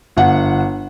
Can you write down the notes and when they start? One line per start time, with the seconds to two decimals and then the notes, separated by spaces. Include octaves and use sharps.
0.16 G1 F#5